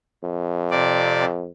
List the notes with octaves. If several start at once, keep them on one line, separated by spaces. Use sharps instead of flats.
F2
C3 D5